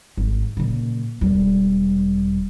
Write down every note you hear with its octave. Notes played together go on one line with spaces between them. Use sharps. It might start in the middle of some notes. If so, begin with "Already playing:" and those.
G#1
A#2 C#3
E1 G3